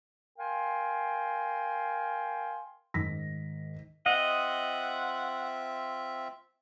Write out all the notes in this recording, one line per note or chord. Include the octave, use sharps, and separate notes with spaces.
A#4 F5 G5 G#5 C6
G#2 D#3 A#6 B6
C4 F4 D#5 E5 F#5